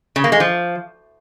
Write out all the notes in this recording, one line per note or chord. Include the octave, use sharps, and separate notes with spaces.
C#3
A#3
G#3
F3